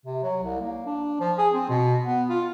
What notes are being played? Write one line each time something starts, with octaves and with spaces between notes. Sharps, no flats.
C3
F#3
C2
A#3
D4
F3
G#4
C4
B2
B3
F4